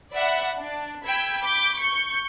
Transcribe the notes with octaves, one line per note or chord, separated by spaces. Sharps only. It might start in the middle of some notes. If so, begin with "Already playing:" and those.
D5 E5 F#5 B5
D4
G5 B5 E6 G#6
B5 D6 G6
C#6 G6